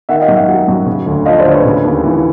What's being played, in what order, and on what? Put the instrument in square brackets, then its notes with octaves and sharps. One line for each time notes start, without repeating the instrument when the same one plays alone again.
[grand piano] D#3 E5 F#5
D#5 F5
F#2
E5 F#5
F#3
F#2
C#3
D2
F3 D#5 F5
C5 D5
D2
B4 C#5
C#3
D#2
E3